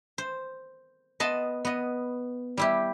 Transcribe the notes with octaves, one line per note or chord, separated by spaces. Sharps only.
C5
B3 D#5 A5 B5 C6
B3 D#5
G3 E4 G4